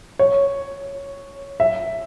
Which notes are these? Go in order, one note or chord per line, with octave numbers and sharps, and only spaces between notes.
C#5
E5